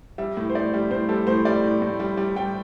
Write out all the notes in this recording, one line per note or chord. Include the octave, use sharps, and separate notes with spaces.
G3 E5
A2
C5
A2 D5
G3
A2 C5
G3 A4
A2 C5
G3 D5
A2
A2
G3
G3
G3 G5